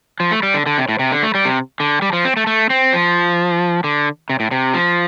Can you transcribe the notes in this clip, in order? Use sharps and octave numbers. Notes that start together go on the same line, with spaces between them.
F3
A3
G3
D3
D3
C3
A2
C3
D3
A3
G3
C3
D3
G3
F3
C4
A3
A3
C4
F3
D3
C3
A2
C3
F3